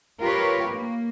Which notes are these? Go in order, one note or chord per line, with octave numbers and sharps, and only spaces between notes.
F4 G4 A#4 B4 C#5
A#3